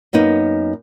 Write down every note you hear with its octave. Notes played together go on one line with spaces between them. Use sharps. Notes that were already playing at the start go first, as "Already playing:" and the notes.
F#2 A#3 B3 D#4